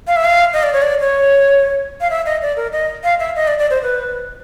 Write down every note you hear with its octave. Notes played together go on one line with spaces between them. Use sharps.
F5
E5
F5
D#5
D5
C#5
D5
C#5
F5
E5
D#5
D5
A#4
D#5
F5
E5
D#5
D5
D5
C5
B4